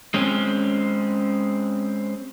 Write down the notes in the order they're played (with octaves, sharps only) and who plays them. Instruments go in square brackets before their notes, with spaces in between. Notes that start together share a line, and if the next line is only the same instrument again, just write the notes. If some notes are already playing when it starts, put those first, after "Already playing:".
[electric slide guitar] G#3 C4 C#4